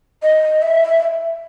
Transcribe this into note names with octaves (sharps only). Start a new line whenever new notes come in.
D#5
E5